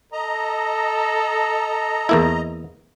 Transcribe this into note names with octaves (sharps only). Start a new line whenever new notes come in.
A4 D#5 A#5
E2 A#3 E4